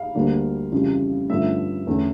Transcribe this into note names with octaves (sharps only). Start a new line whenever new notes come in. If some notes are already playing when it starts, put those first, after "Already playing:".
Already playing: F5
D2 D3 G3 A#3 D4
F2 C#3 E3 G3
G2 D3 F3 A3 C#4 E5
E2 D3 A3 C#4